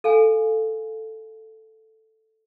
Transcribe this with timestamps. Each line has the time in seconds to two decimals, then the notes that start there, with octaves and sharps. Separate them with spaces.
0.04 A4 F5 G#5